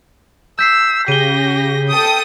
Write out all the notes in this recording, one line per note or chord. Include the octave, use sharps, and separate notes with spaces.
E6 G6 B6 C7
C#3 G4 A#6 D#7 G7
A4 G5 D#6